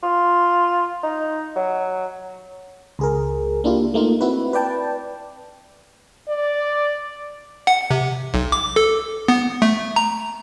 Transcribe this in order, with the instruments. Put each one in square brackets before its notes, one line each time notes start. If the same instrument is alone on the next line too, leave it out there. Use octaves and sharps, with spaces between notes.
[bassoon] F4
D#4
F#3
[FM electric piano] C#2 G#4 A#4
A#3 D4 E4 F4 G4
A3 A#3 D#4 F4
C4 E4 F#4 B4
B4 D5 G5 A5
[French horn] D5
[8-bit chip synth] F#5
C3
B1
D6
A4
B3
A3
A#5